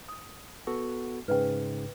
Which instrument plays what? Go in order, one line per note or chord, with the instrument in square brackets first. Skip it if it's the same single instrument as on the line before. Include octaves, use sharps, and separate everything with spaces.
[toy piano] D#6
[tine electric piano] B3 F#4 A4
[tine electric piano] G#2 C#3 [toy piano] B4 D#5 G5